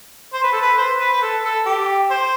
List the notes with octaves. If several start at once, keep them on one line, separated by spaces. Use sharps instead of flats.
C5
B4
A4
B4
C5
B4
B4
A4
A4
G4
C5